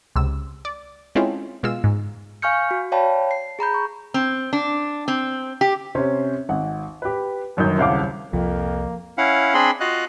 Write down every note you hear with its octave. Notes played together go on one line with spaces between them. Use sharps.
C#2 C3 E6
D5
G#3 C4 C#4 E4 F4 A4
B2 G#3 F4 E6
G#2
F5 G#5 C#6 F6 G6 C#7
F#4
C#5 D5 F5 G5 A5 B5
C7
G#4 A#5 B5 G6
C#6
C4
D4
C4
G4
C3 C#4 C5
G#1 F#5
G4 B4
G1 F#2 D#3 G6
D#1 C2 C#3 F5 F#5 D6
C2 F2 F3 A#3
C#4 E4 F5 F#5
C4 D4 G#4 B5 C6
F4 F#4 D#5 F5 F#6